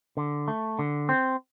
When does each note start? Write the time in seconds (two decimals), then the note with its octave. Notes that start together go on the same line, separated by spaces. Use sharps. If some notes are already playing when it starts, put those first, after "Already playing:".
0.17 D3
0.48 A3
0.79 D3
1.09 C4